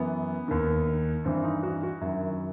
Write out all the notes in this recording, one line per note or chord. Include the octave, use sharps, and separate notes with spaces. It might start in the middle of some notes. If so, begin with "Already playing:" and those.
Already playing: F#2 E3 B3
D#2 D#3
G2 E3 C4
D#4
F#4
F#4
F#2 D#3 E4